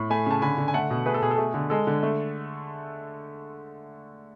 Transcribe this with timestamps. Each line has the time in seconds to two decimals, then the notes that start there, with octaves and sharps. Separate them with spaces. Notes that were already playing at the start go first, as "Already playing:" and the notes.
Already playing: A2
0.10 A3 G#5 B5
0.26 C#3 A5
0.42 D3 G#5 B5
0.58 D3
0.68 G#5
0.74 A3 F#5 A5
0.90 B2
1.06 A3 G#4 B4
1.14 A4
1.22 B2 G#4
1.31 A4
1.38 A3 G#4
1.54 D3
1.70 G#3 A4
1.87 D3
2.03 A3